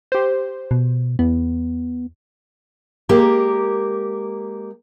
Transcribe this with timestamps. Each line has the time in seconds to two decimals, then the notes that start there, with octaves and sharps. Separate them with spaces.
0.12 G4 C5
0.71 B2
1.19 E2 B3
3.09 G#3 A#3 G4 A#4